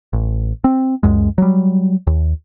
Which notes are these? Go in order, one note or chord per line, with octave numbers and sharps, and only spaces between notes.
A1
C4
C#2 F#2 G#3
F#3 G3
D#2